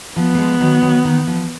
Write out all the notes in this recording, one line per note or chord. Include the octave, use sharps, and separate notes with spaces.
F3 B3
A#3
F3 G#3
D#3 F#3
D#3 F#3
D#3
F3